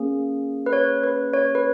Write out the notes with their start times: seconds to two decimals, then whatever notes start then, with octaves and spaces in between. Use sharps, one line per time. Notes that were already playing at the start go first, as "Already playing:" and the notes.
Already playing: A#3 C#4 G#4
0.66 B4
0.73 C#5
1.04 B4
1.33 C#5
1.55 B4